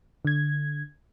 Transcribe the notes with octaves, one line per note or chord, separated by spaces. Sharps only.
D3 G#6